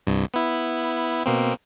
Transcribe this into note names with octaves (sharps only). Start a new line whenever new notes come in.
C2 G2
B3 E4
B2 A#3 C4